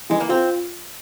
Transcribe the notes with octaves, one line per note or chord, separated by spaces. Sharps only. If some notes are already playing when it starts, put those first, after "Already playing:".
E3 G#3
A#3
C4 F4